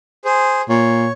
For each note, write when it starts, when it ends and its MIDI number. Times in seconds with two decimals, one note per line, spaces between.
0.25 0.61 68
0.25 0.61 72
0.69 1.09 46
0.69 1.12 73